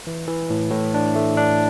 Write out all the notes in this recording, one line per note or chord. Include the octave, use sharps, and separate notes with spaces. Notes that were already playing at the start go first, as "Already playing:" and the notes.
E3
E3
A2
A2
D4
A3
D4